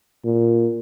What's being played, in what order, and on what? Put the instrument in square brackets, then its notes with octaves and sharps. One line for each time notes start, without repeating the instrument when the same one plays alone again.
[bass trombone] A#2